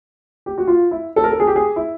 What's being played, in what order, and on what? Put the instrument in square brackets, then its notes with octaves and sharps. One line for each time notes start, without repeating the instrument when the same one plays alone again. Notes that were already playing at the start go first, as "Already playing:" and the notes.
[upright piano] G4
F#4
F4
E4
A4
A#4
A4
G#4
G4
G#4
E4